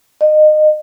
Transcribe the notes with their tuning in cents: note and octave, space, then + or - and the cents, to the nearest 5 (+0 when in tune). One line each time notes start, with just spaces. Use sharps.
D#5 -25